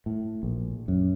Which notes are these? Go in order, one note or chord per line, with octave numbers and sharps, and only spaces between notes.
A2
A#1
F#2